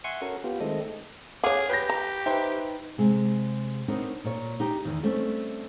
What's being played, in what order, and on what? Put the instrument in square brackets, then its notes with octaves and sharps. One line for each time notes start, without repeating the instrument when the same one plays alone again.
[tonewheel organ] E5 F#5 G#5 C6 C#6
C#4 F#4 A4 A#4
B3 F4 G4
D#3 G#3 A3 C4 A4 D#5
[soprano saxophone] G#4 [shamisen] C#5 F#5 [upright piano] F5 D6
[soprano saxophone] G4 [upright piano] B4 G6 A#6
[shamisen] A#5
[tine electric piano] D#4 B4 [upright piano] C5 E5 G5
[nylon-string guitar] C3 G#3
B3 C4 D4 D#4 A#4 C#5
A#2 C#5
D#4 G4 G5
E2 D#3
G3 A3 C4 C#4